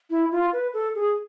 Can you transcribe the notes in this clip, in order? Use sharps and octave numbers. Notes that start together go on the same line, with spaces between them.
E4
F4
B4
A4
G#4